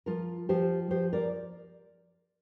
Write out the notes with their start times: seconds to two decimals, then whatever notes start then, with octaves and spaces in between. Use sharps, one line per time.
0.06 F3 F4 A#4
0.49 F3 G4 C5
0.91 F3 G4 C5
1.13 A#4 D5